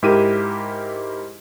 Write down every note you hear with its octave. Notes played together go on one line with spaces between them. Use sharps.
G#2 E4 G4 A#4 D#7